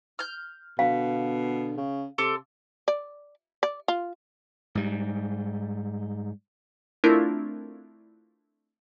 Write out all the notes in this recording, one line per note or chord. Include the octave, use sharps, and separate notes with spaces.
F6 G6
B2 D3 F5
C#3
C3 A4 C6 D6
D5
D5
F4
G#2 G3
A3 C4 D4 E4 F4 A#4